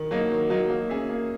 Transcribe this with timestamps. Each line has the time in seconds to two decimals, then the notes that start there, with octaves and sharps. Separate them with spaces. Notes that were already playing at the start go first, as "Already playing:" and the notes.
Already playing: D#3
0.11 F#3 A#3 D#4
0.31 D#3
0.50 F#3 A#3 D#4
0.70 A#3
0.89 C#4 G#4 C#5 E5
1.09 A#3